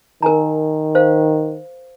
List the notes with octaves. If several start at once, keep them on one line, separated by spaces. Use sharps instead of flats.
D#3 A#4 G#5 A#5
C5 F5